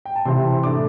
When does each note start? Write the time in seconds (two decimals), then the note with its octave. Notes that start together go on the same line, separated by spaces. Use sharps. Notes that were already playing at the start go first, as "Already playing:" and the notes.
0.05 G5
0.15 A5
0.25 C3 E3 C4 E4 C6
0.63 A2 A3 D4 D6